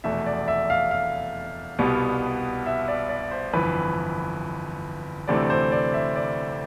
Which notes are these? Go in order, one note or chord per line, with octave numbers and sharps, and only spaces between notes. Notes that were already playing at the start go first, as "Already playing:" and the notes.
F1 E2 B2 A3 E5
D5
E5
F5
F5
C2 B2 G3 B3
E5
D5
D5
C5
G1 F2 E3 B4
D2 C3 E3 A3 C4 D5
C5
D5
E5
D5